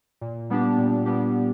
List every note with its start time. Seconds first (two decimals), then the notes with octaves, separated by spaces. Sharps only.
0.21 A#2
0.50 G3 B3 D4 G4
0.78 A#2
1.06 G3 B3 D4 G4